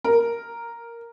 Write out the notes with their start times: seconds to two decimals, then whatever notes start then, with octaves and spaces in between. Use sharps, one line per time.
0.05 A#4